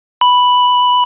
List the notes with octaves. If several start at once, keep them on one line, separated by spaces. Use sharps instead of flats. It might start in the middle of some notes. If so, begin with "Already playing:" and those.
B5